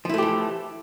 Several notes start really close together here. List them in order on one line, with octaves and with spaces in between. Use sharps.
F3 E4 A3 G4 E3